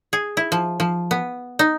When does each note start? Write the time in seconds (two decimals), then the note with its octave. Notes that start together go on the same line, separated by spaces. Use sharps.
0.13 G#4
0.37 E4
0.52 F3
0.80 F3
1.11 B3
1.59 D#4